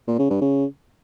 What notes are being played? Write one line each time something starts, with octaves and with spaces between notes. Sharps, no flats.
A#2
C#3
G2
C#3